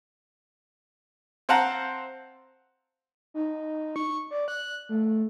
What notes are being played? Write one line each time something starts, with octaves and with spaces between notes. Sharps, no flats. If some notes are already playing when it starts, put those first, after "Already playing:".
C4 C5 F5 F#5 A5 A#5
D#4
C#6
D5
F#6
A3